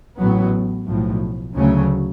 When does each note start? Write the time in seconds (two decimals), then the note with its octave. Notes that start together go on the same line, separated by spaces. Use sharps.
0.18 A1 A2 F#3 B3
0.87 B1 A2 F3
1.55 D2 C#3 F#3 A3 C#4